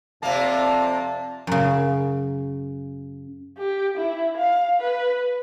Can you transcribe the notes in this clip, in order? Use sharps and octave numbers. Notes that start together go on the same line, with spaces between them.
F2 C3 A#3 C4 D5 E5 F5 A5
F#2 C#3
G4
E4
F5
B4